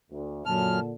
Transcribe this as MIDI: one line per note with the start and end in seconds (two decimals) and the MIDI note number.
0.11 0.45 38
0.46 0.80 42
0.46 0.94 46
0.46 0.94 50
0.46 0.79 81
0.46 0.80 89